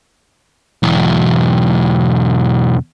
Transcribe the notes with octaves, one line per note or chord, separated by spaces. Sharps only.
B1 E2